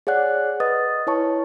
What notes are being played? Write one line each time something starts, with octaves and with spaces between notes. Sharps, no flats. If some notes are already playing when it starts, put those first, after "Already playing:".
G#4 C#5 D5 F#5 F#6
B4 D#5 D#6 A6
E4 B4 C#5 A5 C#6